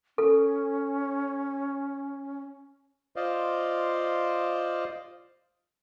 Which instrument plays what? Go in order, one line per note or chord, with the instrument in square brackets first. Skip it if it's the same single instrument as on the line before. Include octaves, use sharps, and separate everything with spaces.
[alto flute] C#4 [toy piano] A4
[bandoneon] F4 C5 D5 D#5 F5